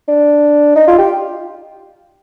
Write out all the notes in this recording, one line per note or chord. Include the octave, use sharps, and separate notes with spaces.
D4
D#4
F4
G4